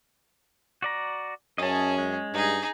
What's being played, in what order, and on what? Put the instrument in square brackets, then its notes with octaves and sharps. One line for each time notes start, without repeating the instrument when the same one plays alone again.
[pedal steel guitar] F#4 D5 A#5
[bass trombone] F#2 [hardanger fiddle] C#4 G#4 [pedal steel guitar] D#5 A5
[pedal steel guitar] G#3
[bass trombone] G2 [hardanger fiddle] D#4 G#4